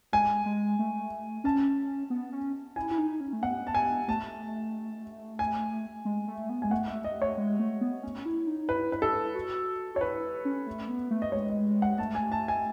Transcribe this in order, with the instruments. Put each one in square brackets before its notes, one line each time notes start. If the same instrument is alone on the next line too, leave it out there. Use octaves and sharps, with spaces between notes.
[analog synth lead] G#3 [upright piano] G#5
[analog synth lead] G#3
A3
[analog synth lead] C#4 [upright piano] A5
[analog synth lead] B3
C#4
[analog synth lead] E4 [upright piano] G#5
[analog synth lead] E4
D#4
C#4
A3
[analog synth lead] B3 [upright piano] F#5
[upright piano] A5
G#5
[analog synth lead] A3 [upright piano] A5
[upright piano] G#5
[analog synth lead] G#3
A3
B3
[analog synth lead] G#3 [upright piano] G#5
[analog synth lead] A3 [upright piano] F#5
[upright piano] E5
D#5
C#5
[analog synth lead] G#3
A3
B3
C#4
E4
D#4
[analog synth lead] E4 [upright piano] B4
[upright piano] B4
A4
[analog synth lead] F#4
[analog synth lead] F#4 [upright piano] C#5
[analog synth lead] E4 [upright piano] B4
[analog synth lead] C#4
A3
B3
A3
[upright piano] D#5
[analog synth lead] G#3 [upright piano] C#5
[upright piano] D#5
F#5
[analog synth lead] A3 [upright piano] A5
[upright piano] G#5
A5
G#5